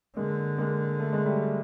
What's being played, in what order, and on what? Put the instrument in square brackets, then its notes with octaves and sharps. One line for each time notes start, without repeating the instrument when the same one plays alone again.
[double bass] D3 [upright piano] G#3 A#3
[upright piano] G#3 A#3
A3
G#3
G3 A3